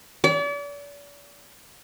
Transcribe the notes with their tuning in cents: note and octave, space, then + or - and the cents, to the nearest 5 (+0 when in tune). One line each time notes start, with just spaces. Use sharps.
D5 -40